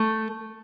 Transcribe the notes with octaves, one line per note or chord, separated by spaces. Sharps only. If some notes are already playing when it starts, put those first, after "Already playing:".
Already playing: A3